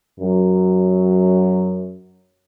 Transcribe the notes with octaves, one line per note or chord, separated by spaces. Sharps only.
F#2 F#3